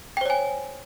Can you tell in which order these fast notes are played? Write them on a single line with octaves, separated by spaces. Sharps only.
G5 C5 C#5 G#5